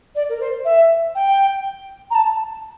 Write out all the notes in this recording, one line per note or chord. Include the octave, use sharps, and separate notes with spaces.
D5
A#4
C5
E5
G5
A#5
A5